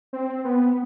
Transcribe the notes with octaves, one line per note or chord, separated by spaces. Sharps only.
C4
B3